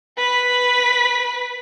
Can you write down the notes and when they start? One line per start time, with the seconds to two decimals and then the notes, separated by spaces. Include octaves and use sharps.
0.17 B4 B6